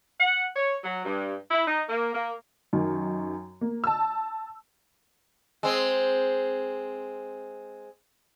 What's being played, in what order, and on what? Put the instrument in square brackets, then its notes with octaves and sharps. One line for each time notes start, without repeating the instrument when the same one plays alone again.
[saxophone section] F#5
C#5
F#3
G2
E4
D#4
A#3
A#3
[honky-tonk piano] F#2 D#3
A#3
A5 E6
[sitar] G#3 C4